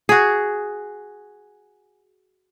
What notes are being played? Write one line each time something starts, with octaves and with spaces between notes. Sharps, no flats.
F#4 G#4